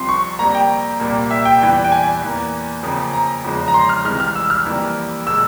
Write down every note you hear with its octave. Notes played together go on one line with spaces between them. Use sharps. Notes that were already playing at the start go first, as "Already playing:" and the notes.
Already playing: C2 C3 F3 C6
C#6
F2 C3 G3 A#3 A#5
G5
C2 A#2 G3 A#3
E5
G5
E2 E3 G3 G5
G5
G#5
E2 E3 A#3
F2 C#3 F3 A#3
A#5
E2 C#3 F3 G#3
A#5
C6
F6
C2 C3 E3 G#3 F6
F6
E6
F6
F2 E3 G3 A#3
A#2 G#3 E6